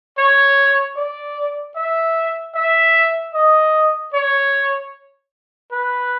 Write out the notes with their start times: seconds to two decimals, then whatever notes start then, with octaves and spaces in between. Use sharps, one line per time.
0.18 C#5
0.97 D5
1.76 E5
2.55 E5
3.34 D#5
4.14 C#5
5.72 B4